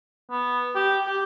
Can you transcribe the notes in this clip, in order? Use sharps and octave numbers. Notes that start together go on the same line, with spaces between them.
B3
G4
G4